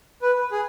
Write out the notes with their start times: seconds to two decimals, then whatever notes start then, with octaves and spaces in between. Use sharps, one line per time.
0.22 B4
0.52 G#4